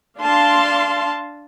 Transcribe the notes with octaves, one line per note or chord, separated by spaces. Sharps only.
D4 F5 A5 C6